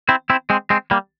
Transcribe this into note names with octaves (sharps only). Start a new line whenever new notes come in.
C4 E4
C4 E4
G#3 C4
G#3 C4
G3 A#3